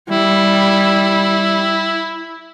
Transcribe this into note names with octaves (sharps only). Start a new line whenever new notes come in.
G3 E4